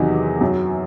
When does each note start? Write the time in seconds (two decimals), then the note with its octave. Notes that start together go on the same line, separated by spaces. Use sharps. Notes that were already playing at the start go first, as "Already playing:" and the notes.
Already playing: E2 C3 D#3 F#3 D#4
0.41 F#2 F#3